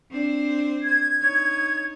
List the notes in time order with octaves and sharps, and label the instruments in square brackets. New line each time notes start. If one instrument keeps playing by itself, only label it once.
[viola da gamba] C4 D4 C5
[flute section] G#6
[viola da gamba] D#4 C#5